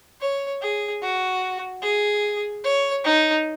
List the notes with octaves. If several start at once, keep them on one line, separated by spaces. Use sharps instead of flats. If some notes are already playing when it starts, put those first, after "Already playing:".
C#5
G#4
F#4
G#4
C#5
D#4